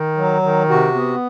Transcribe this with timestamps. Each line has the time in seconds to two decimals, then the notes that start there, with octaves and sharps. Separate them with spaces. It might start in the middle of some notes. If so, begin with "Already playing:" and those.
Already playing: D#3
0.17 F#3
0.43 D#3
0.69 C3 F#4
0.95 B3